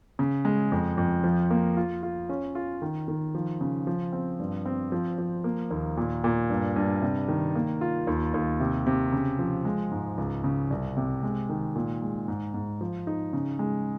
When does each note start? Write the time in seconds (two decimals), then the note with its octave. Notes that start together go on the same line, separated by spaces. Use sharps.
0.19 C#3
0.45 G#3
0.72 F2
0.97 F2
1.24 F3
1.51 A#3
1.77 F4
2.03 F4
2.29 C#4
2.55 F4
2.82 D#3
3.08 D#3
3.35 F3
3.61 C#3
3.87 F3
4.13 C4
4.39 G2
4.66 C4
4.92 F3
5.18 F3
5.44 A#3
5.71 D#2
5.97 A#2
6.24 A#2
6.50 G2
6.76 G2
7.02 C3
7.28 D#3
7.55 A#3
7.81 F4
8.07 D#2
8.34 D#2
8.60 C3
8.87 C3
9.13 C#3
9.39 F3
9.65 G#3
9.91 G#2
10.18 C#2
10.44 C#3
10.70 C2
10.97 C3
11.23 G#3
11.49 D#3
11.76 A#2
12.02 G#3
12.28 G#2
12.54 G#2
12.81 F3
13.07 D#4
13.33 C#3
13.59 G#3